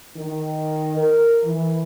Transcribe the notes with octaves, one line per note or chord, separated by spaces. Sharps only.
D#3
A#4
E3